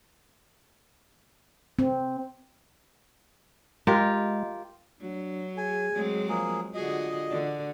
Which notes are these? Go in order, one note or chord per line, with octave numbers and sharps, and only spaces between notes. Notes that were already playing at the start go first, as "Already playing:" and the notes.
C4
G#3 F4 G4 A#4
F#3 D4
G#4 G#5
F#3 G#3 C4
F3 A#3 G#4
D3 F4 F#4 G#4 D#5
D3 F#4